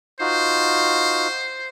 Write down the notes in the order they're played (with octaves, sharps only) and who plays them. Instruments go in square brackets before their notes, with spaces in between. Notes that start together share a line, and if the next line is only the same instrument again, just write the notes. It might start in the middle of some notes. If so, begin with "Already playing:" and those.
[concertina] D#4 F4 F#4 [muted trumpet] C5